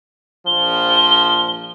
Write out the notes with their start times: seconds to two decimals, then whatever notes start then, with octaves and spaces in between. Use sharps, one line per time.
0.47 A#1 F3 G7